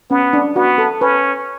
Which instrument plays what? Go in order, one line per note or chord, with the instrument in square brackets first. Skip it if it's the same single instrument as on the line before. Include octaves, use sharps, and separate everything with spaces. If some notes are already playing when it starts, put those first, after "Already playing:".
[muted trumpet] B3 [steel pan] C#4
[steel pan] D4
[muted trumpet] B3 [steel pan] F#4
[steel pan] A4
[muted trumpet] C#4 [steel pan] B4